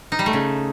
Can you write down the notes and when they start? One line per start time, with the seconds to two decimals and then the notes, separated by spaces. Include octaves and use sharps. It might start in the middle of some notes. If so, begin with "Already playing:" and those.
0.12 D#4
0.19 G3
0.26 A3
0.33 C#3